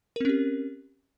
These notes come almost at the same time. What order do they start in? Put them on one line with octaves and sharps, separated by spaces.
A#4 C4 C#4 G4